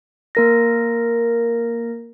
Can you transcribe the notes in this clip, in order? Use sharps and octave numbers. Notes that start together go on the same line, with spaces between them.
A#3 A#4 A#6